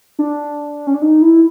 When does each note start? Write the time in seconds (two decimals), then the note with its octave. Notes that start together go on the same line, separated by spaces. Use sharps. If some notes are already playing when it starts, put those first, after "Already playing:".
0.19 D4
0.87 C#4
0.94 D4
1.02 D#4
1.22 E4